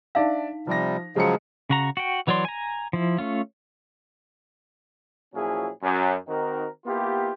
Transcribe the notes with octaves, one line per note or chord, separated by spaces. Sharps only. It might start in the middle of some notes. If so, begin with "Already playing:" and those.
D4 D#4 D5 E5 F5
C3 F3 G3 A#6
C#3 F3 F#3 G#3 C#7
C#3 F#4 A#5
F#4 G5
E3 F#3 C#5 D5 C6
G#5 A#5
F3 E4
A3 C#4 F4
A#2 F3 F#3 C#4 E4 G#4
F#2
D#3 C4 D#4 F#4 A#4
A#3 B3 E4 F4 G4